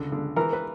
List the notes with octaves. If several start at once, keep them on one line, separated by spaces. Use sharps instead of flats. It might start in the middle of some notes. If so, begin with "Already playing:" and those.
Already playing: C#2 D3
D3
E3 A#4
B4